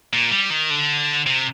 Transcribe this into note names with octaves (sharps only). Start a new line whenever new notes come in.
A#2
G3
D#3
D3
C3